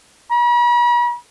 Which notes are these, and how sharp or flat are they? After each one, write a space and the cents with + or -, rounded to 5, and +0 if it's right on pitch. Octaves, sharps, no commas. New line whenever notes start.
B5 -45